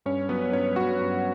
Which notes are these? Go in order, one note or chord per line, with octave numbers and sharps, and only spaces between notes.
G2 C#4 C#5
F#3 B3 B4
G2 C#4 C#5
F#3 B3 F#4 F#5
G2